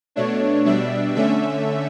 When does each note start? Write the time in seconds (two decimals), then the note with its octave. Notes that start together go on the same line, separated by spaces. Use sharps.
0.16 B2 A3 D4 C#5
0.65 B2 G3 D4 E5
1.15 D3 A3 C#4 E5